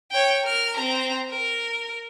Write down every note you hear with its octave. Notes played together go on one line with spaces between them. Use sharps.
C#5 G5
A#4 F6
C4 A#5
A#4